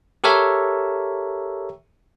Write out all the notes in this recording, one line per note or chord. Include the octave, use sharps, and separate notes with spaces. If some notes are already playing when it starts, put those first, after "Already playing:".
G4 A4 A#4 C#5 E5